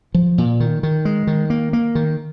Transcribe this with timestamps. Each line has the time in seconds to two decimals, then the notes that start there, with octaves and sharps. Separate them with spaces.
0.14 F3
0.38 A#2
0.60 D#3
0.83 D#3
1.05 G#3
1.27 D#3
1.50 A#3
1.73 A#3
1.95 D#3